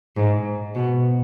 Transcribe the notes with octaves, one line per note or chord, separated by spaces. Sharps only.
G#2
B2